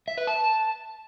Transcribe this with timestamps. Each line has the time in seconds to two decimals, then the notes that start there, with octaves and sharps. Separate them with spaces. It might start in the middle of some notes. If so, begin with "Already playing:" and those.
0.08 E5
0.18 B4
0.27 A5